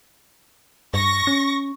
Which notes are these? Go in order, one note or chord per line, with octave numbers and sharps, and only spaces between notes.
G2 C#6 A#6
C#4